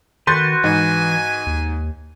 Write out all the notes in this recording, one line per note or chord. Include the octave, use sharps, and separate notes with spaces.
D#3 F#4 B4 C6 G6 A6
G#2 E3 G#5
D#2